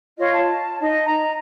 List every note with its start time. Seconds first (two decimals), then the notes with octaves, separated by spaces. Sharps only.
0.18 F4 C#5 D#5
0.35 A5
0.81 D#4 D#5
1.06 A#5